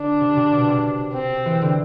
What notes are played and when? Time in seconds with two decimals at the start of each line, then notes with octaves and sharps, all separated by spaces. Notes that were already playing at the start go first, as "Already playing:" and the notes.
Already playing: D3 D4
0.21 C3
0.36 C3
0.52 B2
0.68 C3
1.15 C4
1.46 E3
1.62 D3